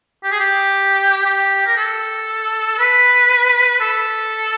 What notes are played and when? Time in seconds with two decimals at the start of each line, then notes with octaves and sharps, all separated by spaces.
0.24 G4
0.32 G#4
0.40 G4
1.26 G4
1.66 A#4
1.77 A4
2.79 B4
3.81 A4